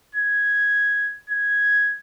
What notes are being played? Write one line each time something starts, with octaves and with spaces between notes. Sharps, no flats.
G#6
G#6